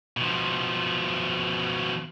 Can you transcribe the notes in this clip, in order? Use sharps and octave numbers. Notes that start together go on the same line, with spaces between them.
B2 F3